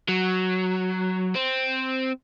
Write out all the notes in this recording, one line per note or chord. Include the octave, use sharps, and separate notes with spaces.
F#3
C4